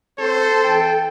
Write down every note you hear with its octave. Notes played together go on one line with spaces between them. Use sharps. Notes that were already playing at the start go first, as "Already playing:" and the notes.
C4 A4 C5
E3 G5